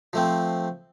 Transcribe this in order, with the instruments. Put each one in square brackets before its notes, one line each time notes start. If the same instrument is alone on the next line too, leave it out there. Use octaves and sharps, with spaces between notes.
[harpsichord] F3 A3 C4